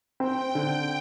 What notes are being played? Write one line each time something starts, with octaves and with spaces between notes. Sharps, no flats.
C4 G5
D3